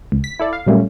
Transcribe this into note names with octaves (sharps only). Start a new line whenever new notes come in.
C#2
B6
E4 A4 D5
F5
A#2 F#3 G3 A3 A#3 C#4